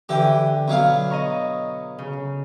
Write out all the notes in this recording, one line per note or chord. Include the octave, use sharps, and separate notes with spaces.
D3 E3 G4 G5
B2 F#3 F5
D#5 A#5 C#6
C#3